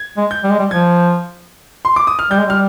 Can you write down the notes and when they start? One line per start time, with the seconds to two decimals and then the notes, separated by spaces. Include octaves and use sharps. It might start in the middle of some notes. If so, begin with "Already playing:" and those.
Already playing: G#6
0.17 G#3
0.31 G6
0.44 G3
0.51 G#3
0.59 G3
0.71 F3 G#6
1.85 C6
1.96 D6
2.07 D#6
2.19 F6
2.30 G3 G6
2.38 G#3
2.46 G3 F6